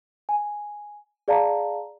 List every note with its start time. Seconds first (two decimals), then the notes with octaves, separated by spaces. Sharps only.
0.29 G#5
1.28 G#4 D5 F5 A5 A#5